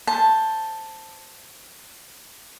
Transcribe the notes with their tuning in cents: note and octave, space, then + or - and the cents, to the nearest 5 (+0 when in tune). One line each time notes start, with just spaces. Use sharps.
C5 +5 A5 +0